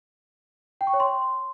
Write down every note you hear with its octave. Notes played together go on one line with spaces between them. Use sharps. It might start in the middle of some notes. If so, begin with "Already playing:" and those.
G5
C#6
C#5
C6